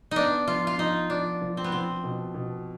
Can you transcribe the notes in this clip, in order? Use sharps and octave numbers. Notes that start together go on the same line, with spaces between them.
B3 D4 D#4
F3 F4
F4
F3 D#4
F3 D4
F3
C4
B3
F3 C4
B2
B2